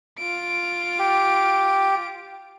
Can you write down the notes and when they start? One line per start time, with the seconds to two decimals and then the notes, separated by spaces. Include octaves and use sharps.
0.19 F4 D7
0.99 G4